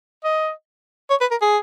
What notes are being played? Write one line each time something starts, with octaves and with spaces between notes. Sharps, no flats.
D#5
C#5
B4
A#4
G#4